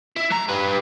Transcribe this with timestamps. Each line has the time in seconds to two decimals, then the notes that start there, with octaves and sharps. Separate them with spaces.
0.16 E4
0.31 F#3 A#5
0.49 G3 B4